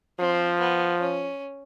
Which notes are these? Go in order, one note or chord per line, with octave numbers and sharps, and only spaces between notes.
F3 C4
B3
C#4